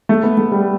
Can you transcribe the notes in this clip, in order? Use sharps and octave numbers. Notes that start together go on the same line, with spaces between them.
A3
B3
A3
G3